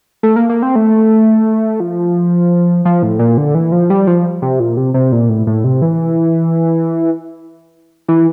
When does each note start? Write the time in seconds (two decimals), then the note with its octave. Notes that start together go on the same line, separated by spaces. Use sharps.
0.23 A3
0.36 A#3
0.49 A#3
0.62 C4
0.76 A3
1.80 F3
2.85 F3
3.03 A2
3.19 A#2
3.37 D3
3.55 E3
3.72 F3
3.90 G3
4.07 F3
4.42 C3
4.60 A#2
4.77 C3
4.94 C3
5.12 A#2
5.29 A2
5.47 A2
5.64 C3
5.82 E3
8.08 E3